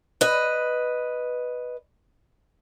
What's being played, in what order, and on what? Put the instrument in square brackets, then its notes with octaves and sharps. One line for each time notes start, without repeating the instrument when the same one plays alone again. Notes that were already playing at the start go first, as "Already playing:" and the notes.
[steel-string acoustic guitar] B4 D#5